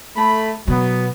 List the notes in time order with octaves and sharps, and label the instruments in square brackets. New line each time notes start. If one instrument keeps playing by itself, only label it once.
[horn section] A3 B5
[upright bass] B2 [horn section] F#3 B3